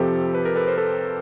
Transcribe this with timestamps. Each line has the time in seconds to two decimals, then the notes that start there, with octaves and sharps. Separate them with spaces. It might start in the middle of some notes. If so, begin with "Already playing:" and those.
Already playing: F2 C3 F3 G4 A4
0.34 B4
0.45 A#4
0.56 A4 B4
0.68 C5
0.77 A4 B4